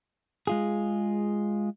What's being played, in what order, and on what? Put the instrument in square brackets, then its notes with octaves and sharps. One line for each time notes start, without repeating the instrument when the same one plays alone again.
[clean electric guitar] G#3 F4 G#4